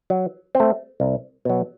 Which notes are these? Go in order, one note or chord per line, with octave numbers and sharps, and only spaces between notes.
F#3
C4
A3
C2
B2 F#3